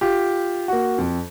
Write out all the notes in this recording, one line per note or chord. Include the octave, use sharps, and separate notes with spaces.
F4 G4
A#3 F#4
F2